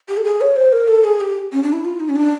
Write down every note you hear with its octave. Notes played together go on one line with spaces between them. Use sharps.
G4
A4
G#4
C#5
C5
A#4
A4
G#4
G4
C#4
D4
E4
F4
D#4
C#4
D4